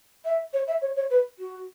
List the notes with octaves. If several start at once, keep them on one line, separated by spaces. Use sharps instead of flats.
E5
C#5
E5
C#5
C#5
B4
F#4